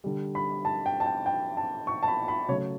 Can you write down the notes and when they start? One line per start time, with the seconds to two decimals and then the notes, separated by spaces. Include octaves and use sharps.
0.04 D3 G3
0.35 B5
0.65 A5
0.86 G5
1.00 A5
1.06 G5
1.26 G5
1.57 A5
1.87 C#6
2.03 A5
2.08 B5
2.28 B5
2.48 C#3 F#3 A3 C#5